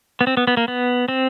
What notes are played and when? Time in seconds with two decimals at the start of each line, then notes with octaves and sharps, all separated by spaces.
0.21 B3
0.27 C4
0.37 B3
0.47 B3
0.57 A#3
0.68 B3
1.08 C4